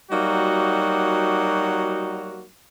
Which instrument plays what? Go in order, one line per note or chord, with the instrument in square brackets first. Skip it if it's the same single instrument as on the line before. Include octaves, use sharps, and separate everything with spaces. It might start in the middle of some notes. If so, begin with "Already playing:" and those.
[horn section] F#3 G3 A#3 D#4 F#4